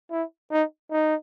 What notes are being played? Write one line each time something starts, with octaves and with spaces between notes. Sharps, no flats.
E4
D#4
D#4